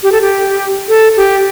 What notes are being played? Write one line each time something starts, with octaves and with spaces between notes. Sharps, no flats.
G4
A4
G4
A4
G4